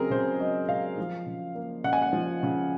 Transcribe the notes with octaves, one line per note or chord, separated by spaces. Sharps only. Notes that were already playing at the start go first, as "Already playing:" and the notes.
Already playing: C#3 F#3 C4 G#4 A#4
C#3 C5
F#3 D#5
C#3 F5
F3
C#3
A#3
C#3 F#5
G#5
F#5
F3
C#3